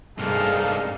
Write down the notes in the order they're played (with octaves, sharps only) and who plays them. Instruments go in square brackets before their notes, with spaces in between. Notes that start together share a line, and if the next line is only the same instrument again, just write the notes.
[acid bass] G2 [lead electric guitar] C3 A#3 [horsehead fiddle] G#3 A4 [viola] D#4 F5